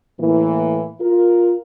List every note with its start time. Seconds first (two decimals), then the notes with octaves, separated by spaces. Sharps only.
0.19 A2 E3 A#3
1.01 F4 A#4